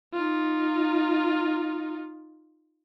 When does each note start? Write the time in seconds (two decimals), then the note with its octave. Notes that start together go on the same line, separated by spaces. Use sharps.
0.13 D#4 F4